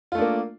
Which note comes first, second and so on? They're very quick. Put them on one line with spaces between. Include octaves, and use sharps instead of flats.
F4 A3 D4 A#3